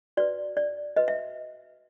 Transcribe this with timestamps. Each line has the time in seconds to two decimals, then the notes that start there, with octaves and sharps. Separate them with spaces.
0.17 F#4 B4 D5
0.57 D5
0.96 F#4 B4 D#5
1.08 E5